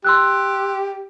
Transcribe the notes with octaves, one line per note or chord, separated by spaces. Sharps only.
G4 C6 E6 F#6